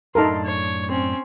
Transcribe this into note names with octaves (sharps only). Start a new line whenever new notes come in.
F#2 A2 D4 D#4 A4 A#4 C6
C#5
C4 C#4